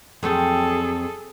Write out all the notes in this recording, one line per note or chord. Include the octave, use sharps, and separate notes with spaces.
F2 F#3 C4 G#4 A4